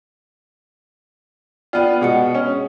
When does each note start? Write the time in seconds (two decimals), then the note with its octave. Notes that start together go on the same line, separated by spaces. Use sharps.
1.73 B3 F4 D5 G5
2.01 B2 G#3 G#4 F#5 C#7
2.35 C#4